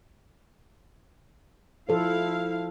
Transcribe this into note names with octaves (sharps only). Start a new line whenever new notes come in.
F3 E4 A4 C5 F5